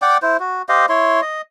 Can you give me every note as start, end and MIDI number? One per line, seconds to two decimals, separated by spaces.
0.02 0.17 74
0.02 0.17 78
0.02 0.17 79
0.02 0.17 86
0.22 0.37 64
0.22 0.37 72
0.40 0.62 66
0.69 0.86 67
0.69 0.86 72
0.69 0.86 75
0.69 0.86 77
0.89 1.21 64
0.89 1.21 73
0.89 1.21 84
1.22 1.42 75